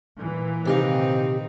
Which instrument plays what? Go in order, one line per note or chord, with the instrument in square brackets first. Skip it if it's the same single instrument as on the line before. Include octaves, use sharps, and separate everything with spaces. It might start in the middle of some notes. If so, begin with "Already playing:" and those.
[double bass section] A#2 E3
[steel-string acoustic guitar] C3 G4 F5 [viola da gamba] D#3 C4 D#4